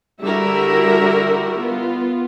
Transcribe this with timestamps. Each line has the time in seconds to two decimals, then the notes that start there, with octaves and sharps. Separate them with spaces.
0.24 D3 G3 E4 F#4 A#4 E5
1.62 B3 F4